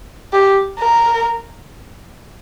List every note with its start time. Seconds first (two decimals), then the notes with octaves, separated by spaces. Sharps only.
0.33 G4
0.79 A#4